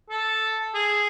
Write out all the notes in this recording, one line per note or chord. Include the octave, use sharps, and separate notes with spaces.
A4
G#4